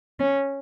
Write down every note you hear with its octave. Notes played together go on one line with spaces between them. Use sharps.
C#4